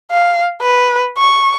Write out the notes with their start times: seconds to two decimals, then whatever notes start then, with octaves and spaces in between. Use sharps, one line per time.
0.11 F5
0.62 B4
1.18 C#6